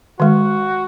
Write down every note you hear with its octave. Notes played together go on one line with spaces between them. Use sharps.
D#3 G#3 F#4